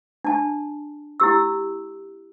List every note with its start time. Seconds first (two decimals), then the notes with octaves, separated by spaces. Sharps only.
0.25 D4 A5
1.20 E4 G4 E6